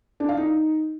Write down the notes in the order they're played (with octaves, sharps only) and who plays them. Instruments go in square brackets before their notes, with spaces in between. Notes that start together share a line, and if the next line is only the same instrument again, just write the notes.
[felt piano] D4
F5
D#4